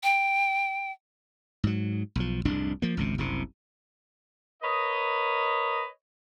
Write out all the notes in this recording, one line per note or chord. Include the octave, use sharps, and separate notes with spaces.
G5
G#2 F#3
B1 F3
F1 C2 G#2 D4
F3 A#3
G#1 C#2 C3
F#1 C2 C3
A#4 B4 C#5 D#5